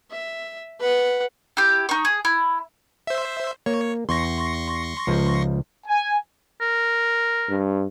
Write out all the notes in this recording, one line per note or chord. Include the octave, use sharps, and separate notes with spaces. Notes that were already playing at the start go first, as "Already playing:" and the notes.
E5
B4 F#5
E4 G4
D#4 C#6
G#4
E4
C5 E5
A#3 C#5
E2 C6 C#6 A#6
C#2 F3
G#5
A#4
G2